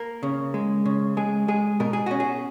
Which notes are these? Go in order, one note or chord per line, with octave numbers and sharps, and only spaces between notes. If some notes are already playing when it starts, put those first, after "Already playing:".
Already playing: A#3 A#4
C#3
G#3
C#3
G#3 G#4
G#3 G#4
B2 A#4
G#4
C#4 F#4
G#4